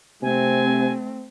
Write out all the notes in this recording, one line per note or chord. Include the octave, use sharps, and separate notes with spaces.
C3 A3 C4 G#5